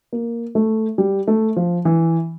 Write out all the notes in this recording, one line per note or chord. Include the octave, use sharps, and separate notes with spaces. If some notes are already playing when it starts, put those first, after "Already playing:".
A#3
A3
G3
A3
F3
E3